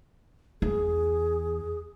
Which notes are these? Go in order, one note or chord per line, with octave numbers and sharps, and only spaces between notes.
E2 G#4